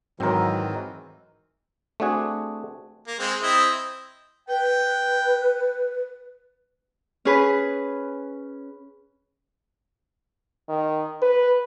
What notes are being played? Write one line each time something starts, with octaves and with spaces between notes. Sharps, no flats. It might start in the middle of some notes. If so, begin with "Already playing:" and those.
G#2 D#3 E3 F#3 C4 A#4
A3 C4 D4 F#4 G#4
A#3
G#3 C4
C4 E4 D#5
B4 G5
C#4 G#4 B4
D#3
B4